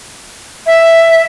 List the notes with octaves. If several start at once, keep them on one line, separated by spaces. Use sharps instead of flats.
E5